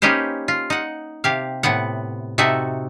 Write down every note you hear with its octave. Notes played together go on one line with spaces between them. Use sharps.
A#3 C#4 D#4 G4 B4 C5
F4
D#4 F#5
C3 G4 F5
A2 C3 B3 F#5
C3 D#4 F#4 A4 E5